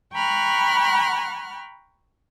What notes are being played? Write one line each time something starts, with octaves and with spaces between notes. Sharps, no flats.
G5 A#5 B5 C#6 F6 F#6